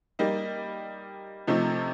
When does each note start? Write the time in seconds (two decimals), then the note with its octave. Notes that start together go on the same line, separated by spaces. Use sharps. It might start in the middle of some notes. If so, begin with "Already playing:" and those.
0.19 G3 A#3 D#4
1.47 C3 F3 A3 D#4